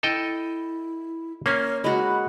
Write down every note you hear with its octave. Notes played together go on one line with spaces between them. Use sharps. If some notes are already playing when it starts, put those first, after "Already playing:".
E4 A4 D#5 G5
A#3 C#4 C#5 C6
G#3 F#4 B5